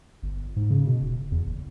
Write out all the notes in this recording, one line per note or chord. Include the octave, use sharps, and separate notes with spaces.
G1
G#2
C#3
B2
D#1
E2
F#1